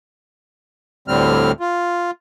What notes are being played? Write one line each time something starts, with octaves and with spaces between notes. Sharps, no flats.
D2 A2 D3 G3 C4 F6
F4